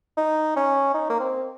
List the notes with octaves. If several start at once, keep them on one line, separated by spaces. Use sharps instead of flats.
D#4
C#4
D#4
A#3
C4